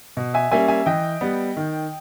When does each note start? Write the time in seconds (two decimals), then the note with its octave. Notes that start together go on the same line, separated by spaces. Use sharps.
0.17 B2
0.34 E5 G#5
0.51 G3 A#3 C#4 E5 G#5
0.68 E5 G#5
0.86 E3 D#5 G5
1.21 G3 B3
1.57 D#3